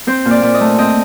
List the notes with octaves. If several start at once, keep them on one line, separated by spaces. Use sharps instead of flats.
C4 C5
A#2
D5
A#2
D#5
A3
C4 D#5